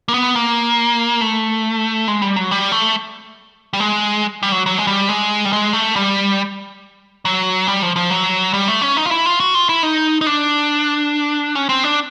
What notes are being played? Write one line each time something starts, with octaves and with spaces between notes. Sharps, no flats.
A#3
B3
A#3
A3
G#3
G3
F#3
G3
A3
G3
G#3
G3
F#3
F#3
G#3
G3
G#3
G3
G#3
A3
G3
F#3
G3
F3
F3
F#3
G3
A3
C#4
D#4
F4
E4
F4
F#4
F4
E4
D#4
D#4
D4
C#4
C4
D4